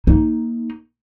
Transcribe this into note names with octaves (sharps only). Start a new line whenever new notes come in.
A#3 D#4